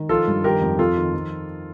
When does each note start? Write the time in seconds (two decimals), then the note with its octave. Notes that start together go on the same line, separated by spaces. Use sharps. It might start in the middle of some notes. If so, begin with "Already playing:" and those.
Already playing: D#3
0.09 F3 F4 A4
0.27 G2
0.44 D#3 G4 A#4
0.61 F2
0.79 F2 F4 A4
0.97 D#3
1.13 F3